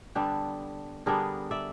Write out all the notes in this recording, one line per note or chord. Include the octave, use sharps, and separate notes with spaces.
D3 G3 B3 D4 G4 A4
D3 G3 B3 D4 G#4 A#4
D5 E5